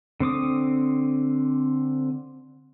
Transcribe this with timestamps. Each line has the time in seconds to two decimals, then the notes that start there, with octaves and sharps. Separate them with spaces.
0.20 D3 C4 D6 D#6